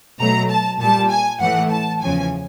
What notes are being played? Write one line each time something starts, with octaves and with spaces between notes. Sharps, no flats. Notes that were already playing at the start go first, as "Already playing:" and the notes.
B2 F#3 A3 A#5
A5
A#2 G3 A5
G#5
A2 E3 A3 F#5
A5
E2 C#3 F3 G#5